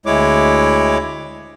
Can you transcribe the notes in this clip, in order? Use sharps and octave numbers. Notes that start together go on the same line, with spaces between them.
D2 G#3 E4 C#5 D6